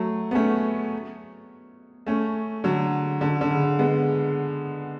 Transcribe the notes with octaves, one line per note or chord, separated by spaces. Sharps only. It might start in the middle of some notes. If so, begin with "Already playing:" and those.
Already playing: F#3 A3
B3
A3 C#4
A3 C#4
D3 F#3
D3
D3
C#3
G#3 B3